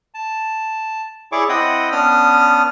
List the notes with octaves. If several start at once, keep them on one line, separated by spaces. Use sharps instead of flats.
A5
E4 G#4 C#5 D5 C#6 D6
C4 E4 D#5 F#5 G5 D#6
B3 C#4 D4 D#6 F6